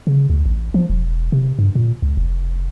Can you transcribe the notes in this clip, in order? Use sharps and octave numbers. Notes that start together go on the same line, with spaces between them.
C#3
D2
A1
F3
E1
C3
G2
A#2
C#2
F1